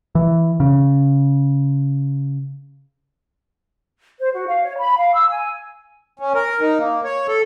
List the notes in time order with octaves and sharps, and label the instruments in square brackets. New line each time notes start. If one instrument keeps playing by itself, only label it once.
[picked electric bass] E3
C#3
[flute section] C5
F#4
F5
C#5
B5
F5
E6
G#5
[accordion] C#4
A#4
D#4
A#3
C#5
A4